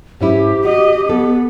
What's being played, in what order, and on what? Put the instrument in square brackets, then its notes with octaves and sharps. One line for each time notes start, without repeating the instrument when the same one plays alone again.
[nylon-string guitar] G#2 C#4 E4 [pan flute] G4
[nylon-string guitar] F#4 [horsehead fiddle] D#5
[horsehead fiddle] B3 [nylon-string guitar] A4